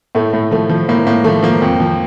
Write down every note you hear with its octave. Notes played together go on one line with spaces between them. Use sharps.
A2 A3
A2
F3 A3
F3
A2 A#3
A2 A#3
F3 A3
F3 A#3
F2
F3